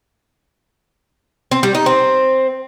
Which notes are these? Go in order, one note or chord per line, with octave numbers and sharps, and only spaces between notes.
C4
G3
D#4
C4